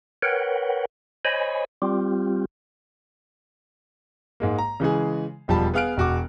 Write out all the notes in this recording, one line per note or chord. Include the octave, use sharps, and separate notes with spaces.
A#4 B4 C#5 F#5 G5
C5 C#5 D#5 G#5 B5
G3 C4 F4 G4
G#2 G#3 A#3
A#5
C#3 E3 G#3 G#4
E1 F3 G3 A5 B5
B3 G#4 F5 F6 F#6 D7
E1 F#4 D6